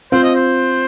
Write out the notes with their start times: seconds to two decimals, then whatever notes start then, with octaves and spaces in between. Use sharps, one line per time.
0.12 C4 F4 C5
0.24 D#5
0.35 C5